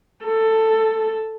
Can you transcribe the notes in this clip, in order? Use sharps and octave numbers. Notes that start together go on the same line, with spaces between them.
A4